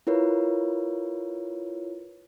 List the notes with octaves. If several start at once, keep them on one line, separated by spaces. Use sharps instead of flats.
E4 F4 A#4 B4 C#5